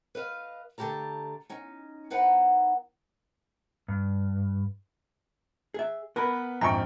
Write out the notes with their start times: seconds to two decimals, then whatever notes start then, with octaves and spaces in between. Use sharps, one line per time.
0.15 B4 D#5 F5
0.78 D3 A3 G4 A5 A#5
1.50 C#4 D#4
2.10 B3 D#4 B4 C5 F#5 A#5
3.88 G2
5.74 G#4 E5
6.16 B3 A#4 B4
6.61 A#1 F2 G#2 G5 G#5 A#5 C#6